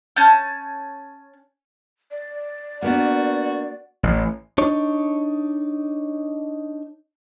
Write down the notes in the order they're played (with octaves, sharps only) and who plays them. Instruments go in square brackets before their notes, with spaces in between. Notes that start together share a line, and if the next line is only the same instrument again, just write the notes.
[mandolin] C#4 A5 G6
[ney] D5
[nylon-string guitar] A#3 B3 D4 [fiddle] F#4
[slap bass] A1
[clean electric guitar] D4 D#4 C#5